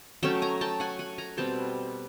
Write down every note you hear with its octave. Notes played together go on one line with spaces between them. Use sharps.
F#3 A3 C#4 G5 A5
G#5 A#5
G5 A5
F#5 G#5
F#5 G#5
G#5 A#5
B2 G3 C4 G5 A5